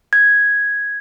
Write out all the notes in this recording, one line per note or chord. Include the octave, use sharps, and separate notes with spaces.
G#6